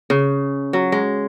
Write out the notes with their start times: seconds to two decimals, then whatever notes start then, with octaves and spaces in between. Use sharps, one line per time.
0.10 C#3
0.73 F#3
0.92 G#3